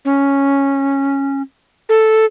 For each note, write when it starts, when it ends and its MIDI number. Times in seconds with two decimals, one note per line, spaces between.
0.05 1.42 61
1.89 2.25 69